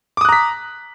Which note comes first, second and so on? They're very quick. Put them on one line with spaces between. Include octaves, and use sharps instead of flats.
D6 D#6 F#6 A#5 B6